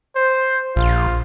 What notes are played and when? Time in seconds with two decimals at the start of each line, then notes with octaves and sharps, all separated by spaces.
0.16 C5
0.76 A#1 F4